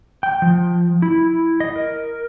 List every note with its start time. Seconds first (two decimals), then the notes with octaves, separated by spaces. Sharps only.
0.23 G5
0.42 F3
1.02 E4
1.60 D#5
1.76 A#4